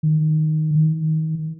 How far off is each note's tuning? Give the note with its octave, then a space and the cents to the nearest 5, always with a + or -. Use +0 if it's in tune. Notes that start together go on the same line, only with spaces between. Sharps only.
D#3 +0
D#3 +25